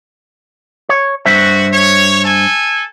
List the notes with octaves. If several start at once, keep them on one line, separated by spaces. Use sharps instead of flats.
C#5
G2 F#4 C5 E5
C#5
A4 G#5